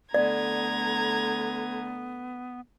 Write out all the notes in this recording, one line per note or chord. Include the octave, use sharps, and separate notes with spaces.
D3 A3 B3 D5 A#5 G#6